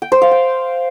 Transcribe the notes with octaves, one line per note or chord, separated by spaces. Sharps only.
G5
C5
F5
G5